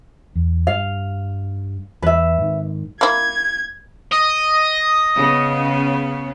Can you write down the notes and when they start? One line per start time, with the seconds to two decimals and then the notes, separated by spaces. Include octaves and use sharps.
0.36 E2
0.67 G2 G3 F5
2.02 E2 B4 E5
2.38 G#2 D#3
3.01 A#3 E4 G#6
4.12 D#5
5.16 C#3 B3